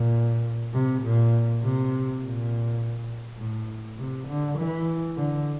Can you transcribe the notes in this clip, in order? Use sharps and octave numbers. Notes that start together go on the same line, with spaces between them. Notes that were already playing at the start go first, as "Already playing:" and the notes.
Already playing: A#2
C3
A#2
C3
A#2
A2
C3
D3
E3
D3